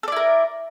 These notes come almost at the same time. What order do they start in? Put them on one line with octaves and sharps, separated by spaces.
A4 D5 E4 A#4